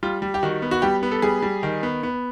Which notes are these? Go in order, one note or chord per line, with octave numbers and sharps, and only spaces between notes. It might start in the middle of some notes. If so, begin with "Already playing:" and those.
G3 F4
G3
G4
D#3 F#4
B3
F#4
G3 G4
B3
A4
G3 G#4
G3
D#3
B3
B3